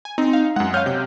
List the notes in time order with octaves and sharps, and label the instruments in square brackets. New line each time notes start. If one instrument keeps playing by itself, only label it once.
[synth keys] G#5
[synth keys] C4 [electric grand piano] D#4
[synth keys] F5
[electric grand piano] F#2 F#5 [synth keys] G#3
[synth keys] C#5 D#5 F5 [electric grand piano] F6 G6
[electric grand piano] C3 [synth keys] G6